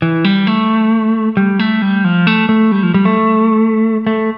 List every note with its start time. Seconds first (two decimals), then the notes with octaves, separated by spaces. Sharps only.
0.02 E3
0.24 G3
0.47 A3
1.37 G3
1.59 A3
1.82 G3
2.04 F3
2.27 A3
2.49 A3
2.72 G3
2.83 F3
2.94 G3
3.05 A3
4.07 A3